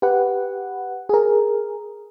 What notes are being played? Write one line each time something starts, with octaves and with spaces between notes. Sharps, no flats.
G4 B4 F#5
G#4 A#4